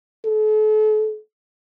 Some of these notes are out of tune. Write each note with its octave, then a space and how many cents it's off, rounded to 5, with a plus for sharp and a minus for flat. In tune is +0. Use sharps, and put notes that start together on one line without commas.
A4 -40